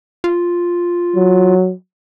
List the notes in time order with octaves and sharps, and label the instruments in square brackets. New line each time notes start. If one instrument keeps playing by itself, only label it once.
[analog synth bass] F4
[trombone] F#3